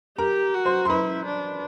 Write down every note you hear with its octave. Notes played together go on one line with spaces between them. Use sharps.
G4 A#4 A#5
F#4
C5 C6
C6
E4 B4 B5
D4